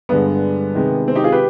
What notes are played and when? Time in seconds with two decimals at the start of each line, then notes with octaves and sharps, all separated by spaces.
0.09 G2 D3 G#3 B3
0.75 C3 D#3 G#3
1.08 C4
1.15 D#4 G4
1.24 F4 G#4
1.32 G4 B4